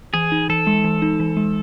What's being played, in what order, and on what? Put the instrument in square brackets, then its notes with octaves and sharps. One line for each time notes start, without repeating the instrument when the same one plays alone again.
[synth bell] E3 [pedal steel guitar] G#4
[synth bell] D#4
[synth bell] E3 [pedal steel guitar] A4
[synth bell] G#3
E3
D#4
E3
G#3